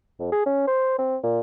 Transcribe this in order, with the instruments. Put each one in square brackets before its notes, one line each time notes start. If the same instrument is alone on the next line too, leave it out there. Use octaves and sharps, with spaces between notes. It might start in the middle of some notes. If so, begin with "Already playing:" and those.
[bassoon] F2
G#4
C#4
C5
C4
A#2